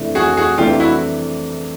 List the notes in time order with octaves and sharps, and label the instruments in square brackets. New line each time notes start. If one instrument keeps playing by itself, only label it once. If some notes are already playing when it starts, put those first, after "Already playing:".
Already playing: [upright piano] F2 C3 E3 A3 D4
[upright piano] F2 [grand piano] F#4 G#4
[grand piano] F#4 G#4
[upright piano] C3 E3 A3 D4 [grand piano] F4 G4
[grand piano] E4 F#4